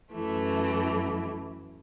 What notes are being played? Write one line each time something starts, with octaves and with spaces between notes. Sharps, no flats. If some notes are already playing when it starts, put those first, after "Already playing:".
F#2 E3 A3